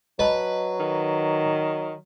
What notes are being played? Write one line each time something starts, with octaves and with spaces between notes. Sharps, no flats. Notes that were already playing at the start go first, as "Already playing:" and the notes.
F#3 B4 D#5 A5 B5
D#3